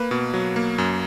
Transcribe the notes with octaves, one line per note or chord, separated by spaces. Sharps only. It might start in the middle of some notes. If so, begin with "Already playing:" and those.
Already playing: A#3 B4
B2
F#3
A#3
F#2